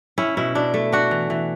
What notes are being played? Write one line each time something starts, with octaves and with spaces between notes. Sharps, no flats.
C#4 E4
B2 E4
B2 D4
A3
D4 F#4
E3
E3